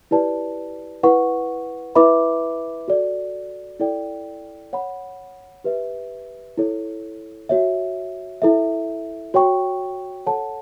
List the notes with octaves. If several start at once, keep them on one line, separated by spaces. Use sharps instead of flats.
E4 G4 B4 D5 A5
E4 B4 F#5 C#6
E4 B4 E5 B5 D6
F#4 A4 D5
E4 A4 D5 G5
C#5 F#5 B5
G4 B4 E5
E4 A4 C#5
F#4 C#5 E5
E4 A4 E5
F#4 C#5 G5 C#6
A4 C#5 F#5 A5